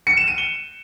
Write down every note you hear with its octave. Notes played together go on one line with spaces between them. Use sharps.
C#7
E7
D#7
G7